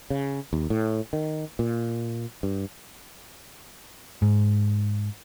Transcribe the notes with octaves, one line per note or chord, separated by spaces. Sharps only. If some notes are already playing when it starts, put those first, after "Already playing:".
C#3
D#2
A2
D#3
A#2
G2
G#2